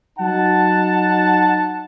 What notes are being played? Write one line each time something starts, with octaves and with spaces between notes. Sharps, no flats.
F#3 D#4 F#5 A5